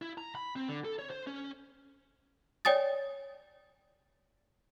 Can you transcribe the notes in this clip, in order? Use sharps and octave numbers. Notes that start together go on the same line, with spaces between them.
E4
A#5
B5
C4
D3
A4
C#5
C5
C#4
C#5 D5 G5 G#5 D#6 A6